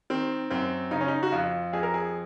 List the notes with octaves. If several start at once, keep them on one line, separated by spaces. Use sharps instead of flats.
D#3 C4
F#2 C4
C#3 D#4
C#4
D#4
F#4
F2 F4
F2 G#4
A#4
G#4